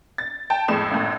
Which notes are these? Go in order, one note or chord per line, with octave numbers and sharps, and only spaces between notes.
A6
G5 A5
F2 A2 G#3 E7
G#1 F#2 A2